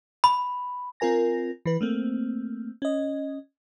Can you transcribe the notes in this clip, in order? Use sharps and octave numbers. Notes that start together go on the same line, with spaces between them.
B5
C4 F4 A#4 G#5 A#6
E3 B4
A3 A#3 C4
C#4 D#5